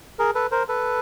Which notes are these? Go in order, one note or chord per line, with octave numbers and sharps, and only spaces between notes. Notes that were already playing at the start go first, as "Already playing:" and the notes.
G#4 A#4
A4 B4
A#4 C5
A4 B4